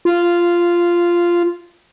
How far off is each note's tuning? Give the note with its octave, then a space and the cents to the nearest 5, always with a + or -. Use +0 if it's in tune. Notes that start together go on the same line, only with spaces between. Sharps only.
F4 -10